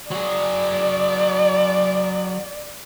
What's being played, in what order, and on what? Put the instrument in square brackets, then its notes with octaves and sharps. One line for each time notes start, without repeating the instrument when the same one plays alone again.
[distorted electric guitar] F#3 G#4 [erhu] D5